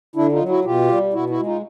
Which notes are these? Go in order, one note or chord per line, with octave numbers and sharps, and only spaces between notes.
D3 D4 E4
D#4 F4
F#3
E4 F#4
B2 F4 G4
G3
B2 E4 F#4
E4 F#4
G#3
D#4 F4